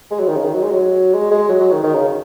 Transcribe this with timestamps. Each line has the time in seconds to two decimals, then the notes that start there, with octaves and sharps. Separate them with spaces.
0.11 G#3
0.20 F#3
0.28 D#3
0.37 C#3
0.45 D#3
0.54 F#3
0.63 G#3
0.71 F#3
1.14 G#3
1.31 G#3
1.49 F#3
1.60 F#3
1.72 D#3
1.84 D#3
1.95 C#3